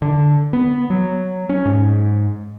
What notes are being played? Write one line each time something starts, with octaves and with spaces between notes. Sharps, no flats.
D3
B3
F#3
C#4
G#2